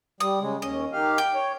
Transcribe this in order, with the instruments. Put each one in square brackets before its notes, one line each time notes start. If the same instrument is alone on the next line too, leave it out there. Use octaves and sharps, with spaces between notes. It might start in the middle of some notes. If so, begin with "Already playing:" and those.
[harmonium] G3 [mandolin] D#6
[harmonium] C#3 G#3
[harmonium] D#2 C#4 [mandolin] D#5
[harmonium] D#3 G4 F5
[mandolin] G5
[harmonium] C#5